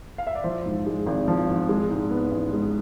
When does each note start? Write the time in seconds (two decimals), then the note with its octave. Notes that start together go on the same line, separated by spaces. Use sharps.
0.18 F5
0.27 E5
0.35 D5
0.44 F3 C5
0.66 G#2
0.86 G#3
1.06 G#1
1.28 F3
1.48 G#2
1.69 G#3
1.90 G#2
2.11 B3
2.31 A1
2.52 G#3